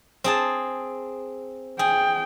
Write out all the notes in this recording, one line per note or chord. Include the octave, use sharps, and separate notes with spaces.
C4 G#4 A5
G#4 G5